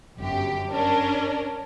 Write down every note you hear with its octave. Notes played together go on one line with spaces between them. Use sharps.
G1 F#2 G4
C#4 D4 A#4